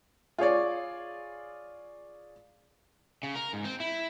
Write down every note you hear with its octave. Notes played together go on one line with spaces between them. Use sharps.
F4 G#4 C#5 D5
C#3
A#4
G#2
C4
E4